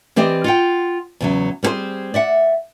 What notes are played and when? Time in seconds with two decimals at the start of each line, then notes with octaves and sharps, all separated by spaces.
0.16 E3 C4 G4 D5 D#5
0.44 F4 F#5 G5
1.20 E2 C#3 F#3
1.63 G3 B3 C4 G#4 C5
2.14 D5 E5 F#5